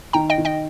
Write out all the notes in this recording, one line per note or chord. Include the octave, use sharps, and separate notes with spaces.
D#3 G5 A#5
D#5 G5
D#3
D#5 G5